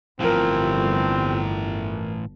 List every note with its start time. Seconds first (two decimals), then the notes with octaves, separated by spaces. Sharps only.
0.20 G1 A2 E3 F3 C4 A#4